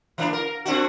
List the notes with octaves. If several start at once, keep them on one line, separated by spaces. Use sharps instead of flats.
E3 A#3 D4
A#4
C4 D4 F#4